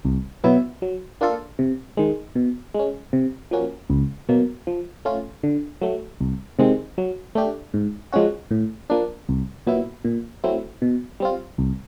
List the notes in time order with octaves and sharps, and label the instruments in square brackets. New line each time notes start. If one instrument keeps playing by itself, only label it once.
[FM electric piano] C2
B2 F#3 B3 E4
F#3
A#3 D4 F4 A4
C3
D#3 G#3
B2
G#3 C#4
C3
F3 A#3 C#4 F#4
C#2
B2 F#3 A#3
F3
A3 C#4 F4
D3
F#3 A3
C2
C3 D#3 G#3 C4
F#3
A3 D4 G4
G#2
F3 G#3 C#4 F#4
A2
F3 A#3 D4
C2
A#2 F#3 B3 E4
A#2
F#3 A3 C4 E4
B2
G3 C4 F4
C2